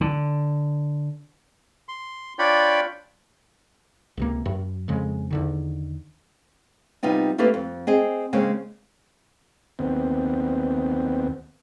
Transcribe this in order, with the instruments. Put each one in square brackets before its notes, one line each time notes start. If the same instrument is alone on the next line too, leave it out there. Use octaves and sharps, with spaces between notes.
[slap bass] D3
[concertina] C6
D4 F4 C#5 D5 G5 B5
[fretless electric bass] C#2 C3 A#3
F#2
F2 C#3 G#3
E2 D3 D#3
[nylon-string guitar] C3 G3 B3 D#4 F4
A3 A#3 G4 A4 B4 F5
F2
C4 G#4 D#5
C#3 G#3 A#3 C4 C#4
[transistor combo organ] D#2 B3 C4